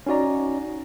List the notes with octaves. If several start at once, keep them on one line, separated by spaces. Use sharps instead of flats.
C#4 D#4 F#4 D5 A#5